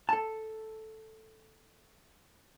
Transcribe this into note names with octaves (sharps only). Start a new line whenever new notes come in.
A4 A5